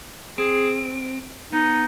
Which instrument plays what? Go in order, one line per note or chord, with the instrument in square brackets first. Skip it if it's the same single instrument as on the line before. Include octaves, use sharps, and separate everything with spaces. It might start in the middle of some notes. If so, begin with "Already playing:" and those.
[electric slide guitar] C4 [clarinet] G#4
[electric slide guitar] B3 [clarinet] D#4